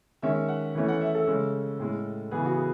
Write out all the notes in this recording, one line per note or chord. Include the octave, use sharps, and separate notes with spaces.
D#3 G#3 C#4 E5
F#5
E3 A3 C#4 E5
F#5
E5
A4
C#3 G#3 C#4
A2 G#3 C#4
C#3 E3 B3 G#4
F#4
G#4